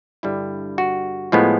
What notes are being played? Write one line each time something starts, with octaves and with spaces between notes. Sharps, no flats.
G2 D3 G3 E4
F#4
A2 F3 G#3 B3